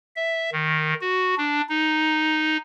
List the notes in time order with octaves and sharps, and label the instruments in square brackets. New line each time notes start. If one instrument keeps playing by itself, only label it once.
[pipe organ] E5
D#3
F#4
D4
D#4